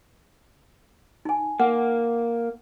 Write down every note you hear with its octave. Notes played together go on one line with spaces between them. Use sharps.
D#4 G#5
A#3 F#5